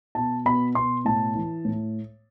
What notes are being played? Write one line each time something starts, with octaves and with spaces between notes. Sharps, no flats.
B2 A5
B2 B5
B2 C6
A2 A5
E3
A2